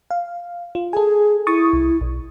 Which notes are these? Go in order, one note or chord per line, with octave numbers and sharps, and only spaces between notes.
F5
F4
G#4 A4 G#5
E4 C#6 D#6 A6
C2
B1